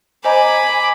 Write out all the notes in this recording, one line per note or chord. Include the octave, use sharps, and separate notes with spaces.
C5 D#5 G#5 A#5 B5 D6